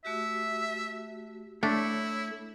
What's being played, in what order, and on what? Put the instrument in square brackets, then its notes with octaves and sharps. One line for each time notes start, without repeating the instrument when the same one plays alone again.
[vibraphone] A3 F#4 G4 [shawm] E5
[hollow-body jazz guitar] A3 [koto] D4 [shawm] E4 [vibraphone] C#5